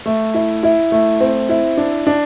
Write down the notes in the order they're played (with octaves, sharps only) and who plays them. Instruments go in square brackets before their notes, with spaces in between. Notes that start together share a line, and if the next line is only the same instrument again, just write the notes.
[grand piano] A3
E4
E4
A3
C4
E4
D4
D4